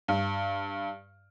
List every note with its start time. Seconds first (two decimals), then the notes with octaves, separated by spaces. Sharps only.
0.08 G2